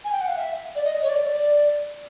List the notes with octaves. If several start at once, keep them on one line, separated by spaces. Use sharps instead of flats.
G#5
G5
F#5
F5
E5
D5
D#5
C#5
D5
D5